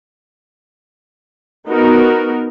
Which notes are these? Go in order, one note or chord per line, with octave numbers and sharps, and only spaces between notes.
B3 D#4 F#4 A#4